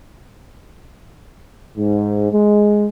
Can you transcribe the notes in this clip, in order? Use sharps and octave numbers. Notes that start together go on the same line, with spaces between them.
G#2
G#3